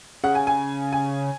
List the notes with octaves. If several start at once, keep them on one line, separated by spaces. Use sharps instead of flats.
C#3 F#5
G#5
G#5
G#5